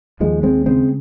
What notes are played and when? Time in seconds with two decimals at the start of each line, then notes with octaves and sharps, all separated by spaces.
0.20 D#2 F3 G#3
0.43 G#3 C4
0.66 C#3 G#3 C4